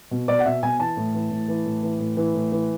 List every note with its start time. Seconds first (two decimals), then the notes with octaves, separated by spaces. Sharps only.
0.11 B2
0.28 B2 D5
0.39 F#5
0.45 B2 E5
0.63 B2 G#5
0.79 E3 A5
0.97 A2
1.14 E3
1.31 A2
1.48 E3
1.66 A2
1.83 E3
2.00 A2
2.17 E3
2.35 A2
2.52 E3